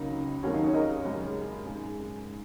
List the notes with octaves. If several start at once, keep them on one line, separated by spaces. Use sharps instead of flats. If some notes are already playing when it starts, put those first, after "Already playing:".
Already playing: C#2 C#3 F#3 A#3 D#4
D#2 D#3 F#3 A#3 C#4 F#4
D#4 G#4
G#4 C#5
A#4 D#5
F#1 F#2 C#3 G#3
G#2 G#3